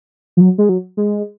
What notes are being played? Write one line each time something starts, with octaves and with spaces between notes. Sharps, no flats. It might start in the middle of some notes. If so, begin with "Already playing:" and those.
F3
F#3
G#3
F#3
G#3